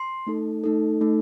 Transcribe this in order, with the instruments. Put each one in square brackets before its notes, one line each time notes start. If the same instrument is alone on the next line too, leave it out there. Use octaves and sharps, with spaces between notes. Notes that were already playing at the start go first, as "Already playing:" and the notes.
Already playing: [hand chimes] C6
A3 D#4 A4
A3 D#4 A4
A3 D#4 A4